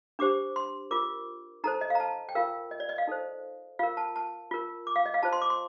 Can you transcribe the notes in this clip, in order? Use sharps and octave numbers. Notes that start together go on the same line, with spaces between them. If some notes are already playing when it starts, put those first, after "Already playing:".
D4 G4 C5 D6
C6
F4 A#4 D6
D#4 A4 C5 A#5
D#5
F5
A#5
A5
G5
F4 A#4 F5
D#5
D5
D#5
F5
D#4 A4 C5
F4 A#4 F5
A5
A5
F4 A#4
D6
F5
D#5
F5
F4 C5 A5
C6
D6
C6